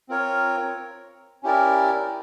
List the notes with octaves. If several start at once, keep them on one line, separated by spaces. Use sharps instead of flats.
C4 F4 A#4 C#5
C#4 E4 G4 A#4 D5